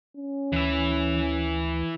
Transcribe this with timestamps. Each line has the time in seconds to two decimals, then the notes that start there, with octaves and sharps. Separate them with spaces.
0.17 C#4
0.52 D2 E3 E5